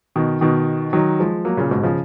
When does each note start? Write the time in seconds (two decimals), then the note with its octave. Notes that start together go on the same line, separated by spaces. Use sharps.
0.16 B2 D#3
0.41 B2 D#3
0.93 D#3 F#3
1.20 F3 G#3
1.45 F#3 A#3
1.57 A#2 C#3
1.71 G#2 B2
1.83 C#3 F3